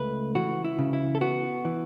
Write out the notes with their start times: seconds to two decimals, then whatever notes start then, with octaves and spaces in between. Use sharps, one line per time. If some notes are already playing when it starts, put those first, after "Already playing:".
Already playing: C#2 A3 B4
0.35 E3 F#4
0.64 E4
0.78 C#3
0.93 E4
1.15 A4
1.21 B3 F#4
1.65 E3